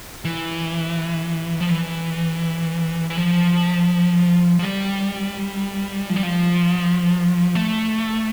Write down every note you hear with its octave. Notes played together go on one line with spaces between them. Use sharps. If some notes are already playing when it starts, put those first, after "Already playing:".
E3
F3
E3
E3
F3
F3
G3
F3
G3
F3
A3